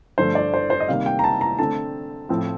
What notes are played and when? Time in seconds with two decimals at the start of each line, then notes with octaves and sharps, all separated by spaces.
0.18 G2 D3 F3 A3 C5
0.35 D5
0.54 C5
0.70 C5
0.80 D#5
0.88 C3 D#3 G3 A#3 F5
1.06 G5
1.19 A#5
1.24 A5
1.41 A#5
1.59 D3 A3 C4 A5
2.29 A2 F3 C4